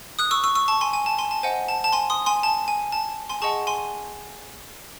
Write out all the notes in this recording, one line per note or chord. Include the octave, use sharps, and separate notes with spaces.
D#6 F#6
C#6 E6
C#6 E6
C#6 E6
A5 C#6
G#5 C6
G#5
A5
G#5 C6
A5
C5 D#5 F#5 G#5
A5
A5
G#5 C6
C6 D#6
G#5 C6
A5
G#5
A5
G#5 C6
G#4 D#5 F#5 A5 C#6
G#5 C6